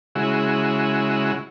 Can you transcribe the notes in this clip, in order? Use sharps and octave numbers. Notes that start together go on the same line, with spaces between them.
C#3 G#3 E4 F#4